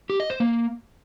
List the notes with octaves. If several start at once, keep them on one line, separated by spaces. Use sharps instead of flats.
G4
D#5
C5
A#3